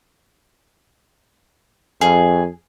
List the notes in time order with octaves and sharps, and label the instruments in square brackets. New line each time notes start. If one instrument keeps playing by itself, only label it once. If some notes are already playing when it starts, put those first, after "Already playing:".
[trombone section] F2 [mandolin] G#4